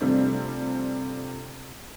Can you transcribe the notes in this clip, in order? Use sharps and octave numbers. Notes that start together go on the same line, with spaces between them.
C3 F3 G3 A3 C4 D4